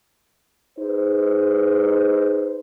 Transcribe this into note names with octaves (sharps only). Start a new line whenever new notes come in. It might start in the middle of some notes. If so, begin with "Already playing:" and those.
D#4 G#4 B4 C5